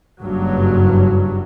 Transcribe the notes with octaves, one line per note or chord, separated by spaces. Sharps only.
F#1 G2 F#3